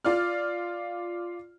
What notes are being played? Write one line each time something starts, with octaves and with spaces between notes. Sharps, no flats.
F4 D5 F6